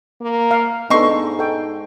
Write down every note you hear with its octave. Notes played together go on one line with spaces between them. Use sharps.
A#3
F5
G#2 B3 D4 D#4 A4 C6 C#6
A4 G5